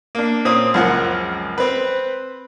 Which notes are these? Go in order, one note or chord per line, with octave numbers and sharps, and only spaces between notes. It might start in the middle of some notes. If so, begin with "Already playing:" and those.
A#3 D4
A#2 C4 C#4 D#6
C#2 F#2 F3 A#4 F#5
C4 B4